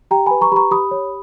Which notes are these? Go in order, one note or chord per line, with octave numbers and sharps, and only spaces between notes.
G4 G5 A#5
B4 G#5 B5
A#5 C#6
G4 A#5 B5 C#6
G4 B5 D#6
C#5